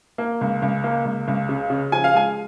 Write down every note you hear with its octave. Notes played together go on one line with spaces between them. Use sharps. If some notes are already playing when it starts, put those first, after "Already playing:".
A#3
C#2
C#2
A#3
C#2
C#2
C#3
C#3
F3 G#5
F5
G#3 G#5